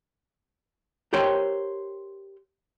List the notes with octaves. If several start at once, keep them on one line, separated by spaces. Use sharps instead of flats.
G4 A#4 C5 C#5 G5